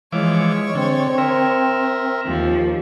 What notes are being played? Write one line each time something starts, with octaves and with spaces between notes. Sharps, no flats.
E3 F3 G#3 C#5 D6
D3 C4
A#4 E5
D#2 F3